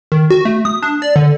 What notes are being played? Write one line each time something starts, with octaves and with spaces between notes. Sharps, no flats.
D#3
F#4
A3
D#6
D4
D5
D3